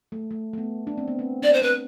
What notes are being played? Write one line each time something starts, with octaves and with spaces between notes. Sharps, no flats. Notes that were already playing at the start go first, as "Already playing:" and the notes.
A3
A3
A3
B3
D4
C4
B3
C4
D4 D5
C5
C4 B4